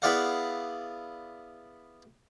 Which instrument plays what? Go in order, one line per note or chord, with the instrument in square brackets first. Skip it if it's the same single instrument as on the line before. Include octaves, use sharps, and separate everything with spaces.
[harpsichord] B3 E4 G#4 D5 F5 F#5